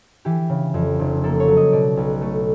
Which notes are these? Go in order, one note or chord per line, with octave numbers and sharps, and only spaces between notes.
E3 G4
C#3
F2
F1
A#3 A4
C#5
F#3
D#5
B2 D5
B1
A3